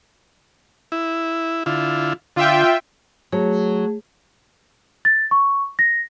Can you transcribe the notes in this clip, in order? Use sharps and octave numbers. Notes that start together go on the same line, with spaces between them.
E4
D3 E4 F4
D3 F4 E5 G5
F#3 A3 G#4
A6
C#6
A#6